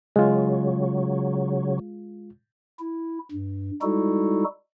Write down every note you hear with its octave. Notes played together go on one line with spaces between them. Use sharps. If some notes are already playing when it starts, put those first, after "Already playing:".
C#3 F#3 G#3 F4
E4
G2
G3 G#3 D#4 E4 F#4 A4